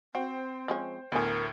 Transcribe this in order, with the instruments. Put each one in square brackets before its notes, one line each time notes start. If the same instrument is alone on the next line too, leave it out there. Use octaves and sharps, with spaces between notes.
[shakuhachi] C4 [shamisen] F#4 [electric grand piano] C5 G5
[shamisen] F3 G#3 C#4
[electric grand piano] D2 A2 [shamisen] B3 G#5 [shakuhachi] A#4